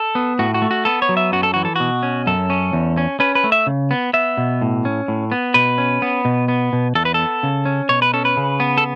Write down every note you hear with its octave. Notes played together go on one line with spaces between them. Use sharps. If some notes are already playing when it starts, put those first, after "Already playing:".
Already playing: A4
B3
A2 F#4
F#4
A3
F#4
B3 A4
C#5
F#3
E5
F#2 F#4
A4
E3 F#4
A4
B2 F#4
C#4
F#2 A4
C#4
E2
C#4
C#4 B4
B4
A3
E5
C#3
B3
B3 E5
B2
A2
C#4
A2
B3
B2 B4
C#4
B3
B2
B3
B2
E2 A4
B4
B3 A4
C#3
C#4
B2 C#5
B4
C#4 A4
B4
C#3
B3
A4